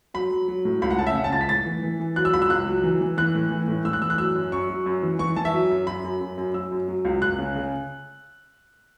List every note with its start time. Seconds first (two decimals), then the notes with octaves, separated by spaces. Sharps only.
0.14 F#3 B5
0.31 F#3
0.48 F#3
0.65 A2
0.82 C#2 B5
0.91 F#5
0.99 C#3 A5
1.07 E5
1.15 C#3 F#5
1.24 A5
1.32 C#2 A6
1.41 B6
1.49 A2 A6
1.66 E3
1.83 E3
2.00 E3
2.16 F#3 F#6
2.25 E6
2.33 C#2 B5
2.42 E6
2.50 C#2 F#6
2.67 F#3
2.84 E3
3.01 E3
3.17 E3 F#6
3.35 A2
3.51 E3
3.68 A2
3.85 A2 E6
3.93 F#6
4.02 E3 E6
4.10 F#6
4.18 F#3 E6
4.35 F#2
4.52 F#2 C#6
4.69 F#3
4.86 F#2
5.03 E3
5.19 E3 C#6
5.36 E3 A5
5.45 E5
5.53 F#3
5.70 F#2
5.87 F#2 B5
6.04 F#2
6.21 F#2
6.38 F#2
6.54 F#3 E6
6.71 F#2
6.88 F#3
7.05 C#2
7.22 C#2 F#6
7.38 C#3
7.55 C#3